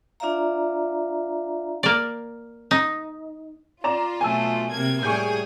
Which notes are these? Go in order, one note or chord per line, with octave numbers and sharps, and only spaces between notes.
D4 F4 D5 E5 F5 A#5
A#3 D5
D#4
F4 D5 A#5 E7
B2 F#3 A3 G#5 A5 E6
C3 A#3 G#6
A2 G3 G#4 G#5 C#6 G6